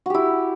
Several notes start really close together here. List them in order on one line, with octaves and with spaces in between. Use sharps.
F#4 G4 E4